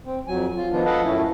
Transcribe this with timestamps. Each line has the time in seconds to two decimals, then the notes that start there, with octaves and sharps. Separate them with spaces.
0.05 C4
0.28 F2 F#3 G#5
0.57 F4
0.71 D#3 F3 B3 D4 F4
0.85 A4 B4 D#5 F5 F#5 A5
1.03 F#2 A2 A3 C#4 E4